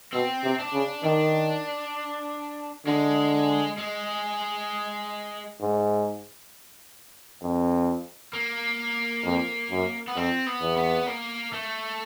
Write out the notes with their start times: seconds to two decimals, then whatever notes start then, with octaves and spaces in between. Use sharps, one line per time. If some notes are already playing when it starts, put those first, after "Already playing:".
0.13 B2 C4
0.43 C3
0.59 D4
0.73 C#3
1.04 D#3 D4
2.86 D3 G#3
3.77 G#3
5.61 G#2
7.42 F2
8.33 A#3
9.25 F2
9.70 F#2
10.07 B3
10.16 F2 C4
10.46 B3
10.61 E2
10.77 B3
11.08 A#3
11.53 A3